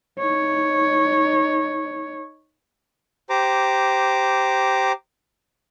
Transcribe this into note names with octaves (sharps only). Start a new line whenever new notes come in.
D#4 C#5
G4 C5 A#5 D6